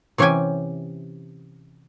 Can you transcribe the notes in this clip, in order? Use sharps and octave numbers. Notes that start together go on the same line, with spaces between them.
C3 E3 C#4 G4 G5 G#5